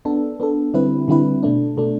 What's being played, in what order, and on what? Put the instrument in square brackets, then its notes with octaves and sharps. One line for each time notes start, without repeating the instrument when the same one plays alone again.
[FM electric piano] B3 D4 A4
B3 D4 A4
D3 G3 C4 E4 B4
D3 G3 C4 E4 B4
B2 A3 D4
B2 A3 D4